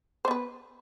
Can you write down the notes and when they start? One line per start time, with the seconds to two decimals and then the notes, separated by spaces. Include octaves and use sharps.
0.25 C5
0.28 B3
0.31 B4